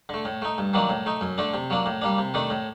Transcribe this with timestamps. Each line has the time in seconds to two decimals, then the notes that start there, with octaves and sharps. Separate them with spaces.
0.09 D3 A3
0.25 A2
0.42 A3 D#4
0.58 G2
0.74 D#3 F#3 A#3 D4
0.89 A2
1.06 A3 D#4
1.21 F#2
1.38 D3 A3 D4
1.54 C3
1.70 F#3 A#3 D4
1.86 A2
2.02 G3 A#3 D4
2.18 C3
2.34 D#3 A3 D4
2.50 A2